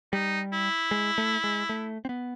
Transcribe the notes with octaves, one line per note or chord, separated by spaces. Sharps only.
G3 D#4
E4
G#3
A3
G#3
A3
C4
B3